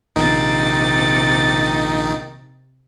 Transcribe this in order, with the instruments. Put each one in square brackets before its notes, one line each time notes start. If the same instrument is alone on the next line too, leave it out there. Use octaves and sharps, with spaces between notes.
[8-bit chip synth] A#1 D#3 D#4 [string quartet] C3 A6